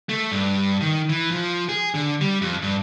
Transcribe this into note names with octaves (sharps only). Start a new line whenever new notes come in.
A3
G2
D#3
E3
F3
G#4
D3
G3
F2
G2